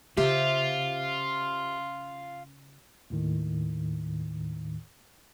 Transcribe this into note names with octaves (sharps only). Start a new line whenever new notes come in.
C#3 F4 G4 C5 E5
D#2 A2 D#3